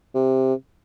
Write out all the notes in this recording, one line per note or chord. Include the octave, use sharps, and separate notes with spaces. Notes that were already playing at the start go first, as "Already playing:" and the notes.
C3